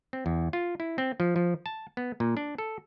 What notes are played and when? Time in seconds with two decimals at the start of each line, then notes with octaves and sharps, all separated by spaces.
0.13 C4
0.26 E2
0.53 F4
0.80 E4
0.98 C4
1.20 F3
1.36 F3
1.66 A5
1.97 B3
2.20 A#2
2.37 D4
2.58 A4